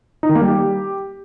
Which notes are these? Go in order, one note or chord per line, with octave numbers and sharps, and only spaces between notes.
D#4
D#3
A#3
G3
G4